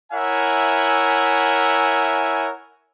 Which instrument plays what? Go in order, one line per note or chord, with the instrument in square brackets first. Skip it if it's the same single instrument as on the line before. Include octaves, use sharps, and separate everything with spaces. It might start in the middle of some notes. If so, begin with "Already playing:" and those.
[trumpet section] E4 A#4 C#5 E5 F#5 G#5